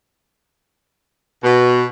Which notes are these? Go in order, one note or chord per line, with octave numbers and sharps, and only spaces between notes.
B2